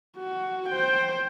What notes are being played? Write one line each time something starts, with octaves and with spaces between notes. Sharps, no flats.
F#4
C5 G5